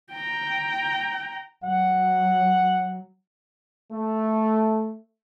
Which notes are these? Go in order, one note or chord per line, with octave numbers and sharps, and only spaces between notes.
G5 A#5
F#3 F#5
A3